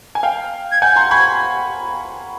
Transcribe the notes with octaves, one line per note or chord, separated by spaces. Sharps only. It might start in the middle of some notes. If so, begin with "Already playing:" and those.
G#5
F5 G5
G#6
F#5 G#5 G6
A#5 C6
B5 C#6 G#6